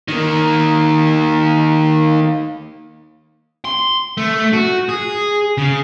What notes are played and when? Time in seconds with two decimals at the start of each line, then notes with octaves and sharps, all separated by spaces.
0.08 D#3 A#3
3.65 C6
4.17 A3
4.53 F#4
4.89 G#4
5.58 C#3